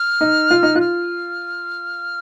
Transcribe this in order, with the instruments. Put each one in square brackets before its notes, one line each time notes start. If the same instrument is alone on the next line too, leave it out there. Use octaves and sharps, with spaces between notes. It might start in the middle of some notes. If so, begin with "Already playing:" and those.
Already playing: [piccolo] F6
[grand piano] D#4
F4
D#4
[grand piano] F4 [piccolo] F#6
[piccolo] F6